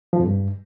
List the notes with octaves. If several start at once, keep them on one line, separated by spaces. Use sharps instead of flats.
F3
F2
G2